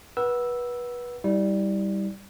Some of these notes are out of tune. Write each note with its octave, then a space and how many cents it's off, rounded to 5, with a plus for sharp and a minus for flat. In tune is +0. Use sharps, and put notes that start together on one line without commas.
B4 -25 F#5 +5 E6 +0
G3 +0 E4 -35